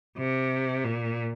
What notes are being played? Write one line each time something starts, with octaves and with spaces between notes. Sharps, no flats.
C3
A#2